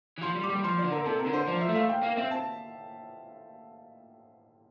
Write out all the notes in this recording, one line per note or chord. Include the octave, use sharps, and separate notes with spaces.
E3
F3 C6
G3
D6
G3
F3 C6
D5
D3
A#4
C3 A4
A#4
D3
C5
F3 D5
E5
A3
F5
G5
A#3 F5
C4 E5
A5